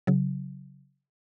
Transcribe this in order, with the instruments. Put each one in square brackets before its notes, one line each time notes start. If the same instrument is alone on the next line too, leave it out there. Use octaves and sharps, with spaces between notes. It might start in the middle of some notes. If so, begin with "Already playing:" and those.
[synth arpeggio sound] C#3 F#3